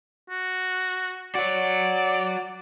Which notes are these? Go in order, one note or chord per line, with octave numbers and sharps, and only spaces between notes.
F#4
F#4 C#5 D5